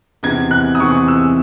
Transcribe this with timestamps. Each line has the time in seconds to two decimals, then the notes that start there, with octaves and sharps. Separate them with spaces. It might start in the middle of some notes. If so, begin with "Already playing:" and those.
0.23 E2 C3 E3 C4 G#6
0.51 F#6
0.75 D#6
0.79 E2 C3 E3 C4 C#6
1.08 E6